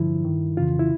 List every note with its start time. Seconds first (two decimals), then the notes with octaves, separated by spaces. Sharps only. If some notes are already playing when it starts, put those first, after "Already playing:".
Already playing: G2 D3 F3 E4
0.25 G2 D#3
0.57 F2 C#3 E3 F4
0.79 E4